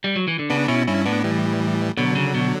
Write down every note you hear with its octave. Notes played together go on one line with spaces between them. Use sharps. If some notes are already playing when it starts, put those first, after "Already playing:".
G3
F#3
E3
D3
C#3 B3 D4
B2 C#4 E4
G2 C#4 E4
A2 B3 D4
E3 G3
B2 D3 F#3
C#3
B2